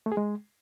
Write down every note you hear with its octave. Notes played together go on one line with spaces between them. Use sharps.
A3
G#4
G#3